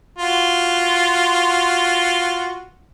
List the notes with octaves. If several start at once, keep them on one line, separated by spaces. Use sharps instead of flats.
F4 F#4